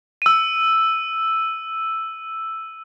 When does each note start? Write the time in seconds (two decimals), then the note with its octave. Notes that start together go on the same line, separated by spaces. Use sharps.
0.22 E6 D#7